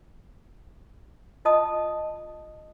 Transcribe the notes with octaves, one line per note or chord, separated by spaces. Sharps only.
F4 D#5 A5 D#6